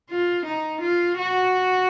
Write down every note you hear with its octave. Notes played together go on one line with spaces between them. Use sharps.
F4
D#4
F4
F#4